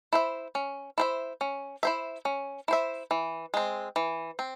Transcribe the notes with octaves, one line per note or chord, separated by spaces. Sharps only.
E4 C5 E5
C#4
E4 C5 E5
C#4
E4 C5 E5
C#4
E4 C5 E5
E3
G#3 C4
E3
C4